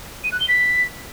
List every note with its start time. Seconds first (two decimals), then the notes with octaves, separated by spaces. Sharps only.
0.24 D#7
0.32 F#6
0.40 G7
0.48 B6